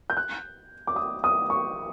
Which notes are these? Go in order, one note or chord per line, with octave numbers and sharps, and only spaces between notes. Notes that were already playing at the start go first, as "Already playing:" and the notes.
G6
F#6
D6
D#6
D#6
C#6